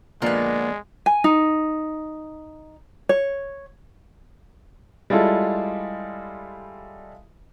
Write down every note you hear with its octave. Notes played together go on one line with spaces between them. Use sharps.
A#2 D3 F3 G#3 A#3 B3 D5
G#5
D#4
C#5
G3 G#3 E4 F4 A4